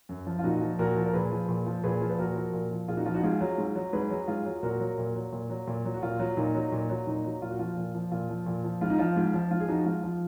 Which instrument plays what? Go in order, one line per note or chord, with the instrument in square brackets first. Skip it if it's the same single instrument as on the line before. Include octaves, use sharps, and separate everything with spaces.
[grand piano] F#2
F3
F4
A#2 D#4 F#4
F3
A#2 F#4 A#4
F3
A#4
A#2 G#4 B4
F3
A#2
F3
A#2 G#4 B4
F3
B4
A#2 F#4 A#4
F3
A#2
F3
A#2 F4 G#4
D#4 F#4
F3 F4
D#4 F#4
G#2 F4 G#4
F#3
G#2
F#3
G#2 G#4 B4
F#3
G#2 F4 G#4
F#3
A#2 F#4 A#4
F#3
A#2
F#3
A#2
F#3
A#2
F#3
F#4
A#2 F4
F#3
A#2 D#4
F#3
A#2
F#3
A#2 D#4
F#3
A#2 F4
F#4
F3 F4
A#2
F3
A#2 F4
F3
A#2
F3
G#2 F4
D#4
F3 F4
G#2
F3
G#2 F4
G#4
F3 D#4 F#4
G#2 F4
F3